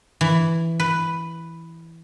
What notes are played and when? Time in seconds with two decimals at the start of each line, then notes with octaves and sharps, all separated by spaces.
0.21 E3
0.80 B4